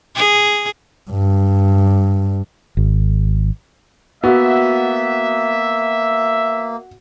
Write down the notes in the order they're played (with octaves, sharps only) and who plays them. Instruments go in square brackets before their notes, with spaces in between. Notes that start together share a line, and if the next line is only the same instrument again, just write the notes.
[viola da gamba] G#4
[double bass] G2
[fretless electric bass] G#1
[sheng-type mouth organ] A#3 [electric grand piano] B3 [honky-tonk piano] F#4 [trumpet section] E5